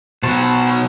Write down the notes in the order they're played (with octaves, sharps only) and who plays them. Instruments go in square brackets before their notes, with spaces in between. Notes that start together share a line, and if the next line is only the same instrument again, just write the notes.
[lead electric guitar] B2 F#3 [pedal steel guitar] F#4 C5 A5